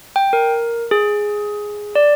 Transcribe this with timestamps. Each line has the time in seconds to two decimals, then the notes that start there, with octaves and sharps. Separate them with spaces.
0.16 G5
0.33 A#4
0.91 G#4
1.95 D5